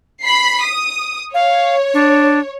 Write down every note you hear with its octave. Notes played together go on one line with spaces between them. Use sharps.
B5 B6 C7
D#6
C#5 F5
D4